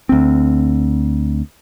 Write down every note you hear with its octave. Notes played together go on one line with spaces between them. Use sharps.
D2 C4